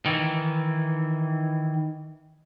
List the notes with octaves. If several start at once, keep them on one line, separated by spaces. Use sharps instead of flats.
D#3 E3